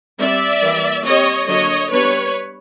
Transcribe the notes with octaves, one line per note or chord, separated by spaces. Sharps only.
G3 C4 D5 E5
E3 G3 A#3
G3 C4 C#5 D#5
D3 F#3 A#3 D4 C#5 D#5
G3 B3 D4 B4 C#5